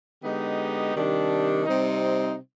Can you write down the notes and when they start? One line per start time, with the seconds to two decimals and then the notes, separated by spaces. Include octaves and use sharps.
0.23 D3 G#3 B3 D#4 G4
0.95 C3 D#3 G3 D4 G4
1.65 C3 G3 C4 D#4